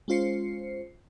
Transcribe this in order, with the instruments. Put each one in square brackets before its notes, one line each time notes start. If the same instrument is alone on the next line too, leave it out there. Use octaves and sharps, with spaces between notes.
[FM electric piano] G#3 C#4 F4 C5 C7 C#7